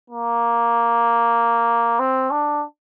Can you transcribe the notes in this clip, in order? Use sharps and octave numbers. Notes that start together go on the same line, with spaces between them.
A#3
C4
D4